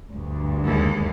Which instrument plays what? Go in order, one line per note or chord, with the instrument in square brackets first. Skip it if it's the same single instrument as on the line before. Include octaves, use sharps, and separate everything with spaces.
[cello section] D2 G2
[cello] D#2 G#3